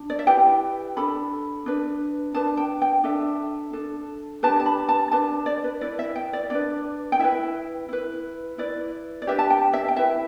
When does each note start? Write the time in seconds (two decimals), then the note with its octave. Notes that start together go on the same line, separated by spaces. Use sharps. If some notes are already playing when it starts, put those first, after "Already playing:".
Already playing: D4
0.10 D5
0.19 E5
0.27 E4 G4 B4 G5
0.96 D4 A4 B5
1.66 D4 B4
2.34 D4 B4 A5
2.57 G5
2.82 G5
3.04 D4 A4 E5
3.73 D4 A4
4.43 D4 G4 B4 A5
4.60 A5
4.66 B5
4.89 A5
5.12 D4 B4 A5
5.46 D5
5.64 B4
5.81 E4 B4 D5
5.99 E5
6.16 G5
6.33 D5
6.50 D4 B4 D5
7.12 G5
7.19 E4 B4 E5
7.89 E4 B4
8.58 E4 B4 D5
9.22 D5
9.27 D4 G4 B4 E5
9.39 A5
9.50 G5
9.73 E5
9.88 G5
9.96 E4 B4 E5